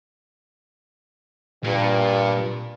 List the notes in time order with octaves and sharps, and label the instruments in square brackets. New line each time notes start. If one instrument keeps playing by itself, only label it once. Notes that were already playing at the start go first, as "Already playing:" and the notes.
[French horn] G2 [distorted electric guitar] A#2 A#3